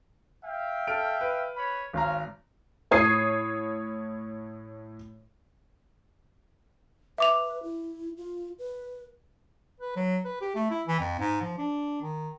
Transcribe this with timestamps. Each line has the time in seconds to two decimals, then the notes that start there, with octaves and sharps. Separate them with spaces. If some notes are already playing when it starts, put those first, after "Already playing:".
0.43 E5 F5 G5
0.87 A4 F6 D7
1.21 B4
1.55 C#5 B5
1.93 G#1 C5 C#5 F5 A#5
2.91 A2 C#5 D#6 G#6 C7
7.18 B4 E5 D6 F7
7.63 E4
8.17 F4
8.59 B4
9.80 B4
9.96 F#3
10.25 B4
10.41 G4
10.55 A3
10.70 E4
10.87 E3
11.00 F2
11.19 G#2
11.42 F3
11.58 D4
12.02 D#3